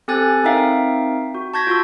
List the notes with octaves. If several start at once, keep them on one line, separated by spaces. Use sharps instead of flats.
C4 G4 A4 G#5 F#6 A6
C4 D#4 A#4 E5 F5 G5
F#4
A5 C#6 G6 G#6 A#6 B6
F4 F#4 C6 E6